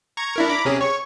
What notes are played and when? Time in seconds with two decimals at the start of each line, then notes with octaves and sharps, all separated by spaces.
0.17 A#5 C#6 G#6
0.36 D4 E4 A#4
0.49 A#5 B5 D6
0.65 C3 C#4 G#4
0.81 C#5 C#6